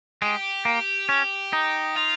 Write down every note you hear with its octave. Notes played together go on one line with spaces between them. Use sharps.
G#3 G4
A#3
C#4
D#4
F4